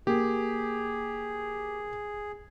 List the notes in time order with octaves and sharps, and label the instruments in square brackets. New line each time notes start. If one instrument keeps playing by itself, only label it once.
[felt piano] A#3 [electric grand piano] G4 [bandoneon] G#4